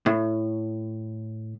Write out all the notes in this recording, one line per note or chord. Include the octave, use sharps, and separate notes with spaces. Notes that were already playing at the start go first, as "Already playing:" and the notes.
A2